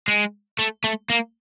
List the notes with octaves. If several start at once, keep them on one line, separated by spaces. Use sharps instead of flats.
G#3
A3
A3
A#3